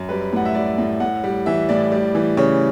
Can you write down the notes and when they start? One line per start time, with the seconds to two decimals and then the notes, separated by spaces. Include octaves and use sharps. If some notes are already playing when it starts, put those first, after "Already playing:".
Already playing: F#2
0.09 G3 B4
0.33 A2 F#5
0.45 E5
0.55 G3 D5
0.78 A2
1.00 A2 F#5
1.24 G3
1.46 E3 E5
1.69 A2 D5
1.92 G3
2.15 E3
2.37 C#3 C#5